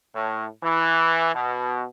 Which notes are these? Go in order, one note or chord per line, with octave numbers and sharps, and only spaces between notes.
A2
E3
B2